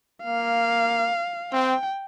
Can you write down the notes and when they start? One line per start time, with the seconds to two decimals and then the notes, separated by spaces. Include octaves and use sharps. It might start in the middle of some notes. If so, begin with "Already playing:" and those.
0.23 A#3 F5
1.52 C4 G5